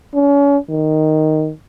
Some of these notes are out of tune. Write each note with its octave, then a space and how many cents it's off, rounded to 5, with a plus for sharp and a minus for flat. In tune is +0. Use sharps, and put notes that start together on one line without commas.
C#4 +35
D#3 +0